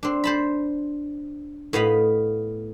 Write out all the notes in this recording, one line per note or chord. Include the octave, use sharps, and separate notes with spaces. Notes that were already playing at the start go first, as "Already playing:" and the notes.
C4 D4
C5 A5 B5
A2 B3 D#5 F5 B5